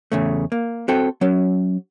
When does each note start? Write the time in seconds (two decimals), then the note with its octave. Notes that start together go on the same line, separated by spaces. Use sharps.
0.12 E2 C#3 A3
0.52 A#3
0.88 C4 F#4 A4 G5
1.21 F#3 C#4